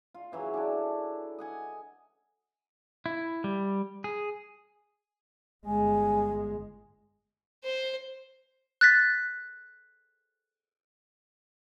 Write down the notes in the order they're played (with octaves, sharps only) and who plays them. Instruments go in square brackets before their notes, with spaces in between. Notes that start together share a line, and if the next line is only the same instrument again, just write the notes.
[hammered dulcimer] F4
C#3 E3 F#3
D4 E4 A4
D#5 F#5 G#5
[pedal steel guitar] E4
G3
G#4
[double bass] G1 G#3 [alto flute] G#5
[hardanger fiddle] C5
[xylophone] F#6 A6 B6